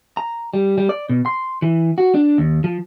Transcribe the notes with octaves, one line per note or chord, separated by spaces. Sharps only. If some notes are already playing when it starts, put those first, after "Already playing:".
A#5
G3
G3
D5
B2
C6
E3
F#4
D4
D#2
F3